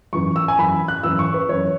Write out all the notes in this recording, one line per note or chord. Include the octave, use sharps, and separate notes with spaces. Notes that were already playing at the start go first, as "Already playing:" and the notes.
F#2 E3 C#6
E6
G#5
F#2 E3 B5
F#6
F#2 E3 E6
C#6
B4
F#2 E3 C#5